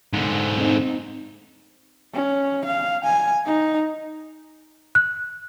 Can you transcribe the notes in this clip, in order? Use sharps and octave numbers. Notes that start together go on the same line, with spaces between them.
G#2 D3
C4 D#4
C#4
F5
G#5
D#4
F#6